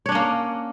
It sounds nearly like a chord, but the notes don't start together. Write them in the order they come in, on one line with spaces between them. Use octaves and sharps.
C#5 D4 C#4 A#3